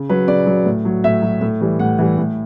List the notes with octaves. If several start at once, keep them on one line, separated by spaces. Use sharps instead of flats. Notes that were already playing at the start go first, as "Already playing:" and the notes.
Already playing: C#3
F#3 B4
C#3 D5
F#3
A2
F#3
A2 E5
F#3
A2
E3 G3
A2 F#5
E3 G3
A2